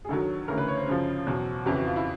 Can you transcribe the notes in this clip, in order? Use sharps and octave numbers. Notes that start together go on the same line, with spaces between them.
G#4
G2 D#3 F#3 A4
D2 C#3 E3 A#4
B4
C#5
C5
F#2 C#3 F3
E2 B2 F#3
F2 C#3 E3 G4
F#4
F4
E4